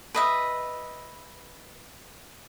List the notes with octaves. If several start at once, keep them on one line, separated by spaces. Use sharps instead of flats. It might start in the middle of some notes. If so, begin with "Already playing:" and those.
B4 D#5 E5